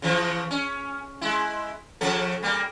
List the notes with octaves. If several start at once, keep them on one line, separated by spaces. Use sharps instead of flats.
C#3 E3 F3
C#4
G#3 E4
C#3 F3 A4
G3 A#3